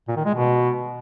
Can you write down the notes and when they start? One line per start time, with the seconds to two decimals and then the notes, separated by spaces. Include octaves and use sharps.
0.08 A#2
0.17 D#3
0.25 G#3
0.34 B2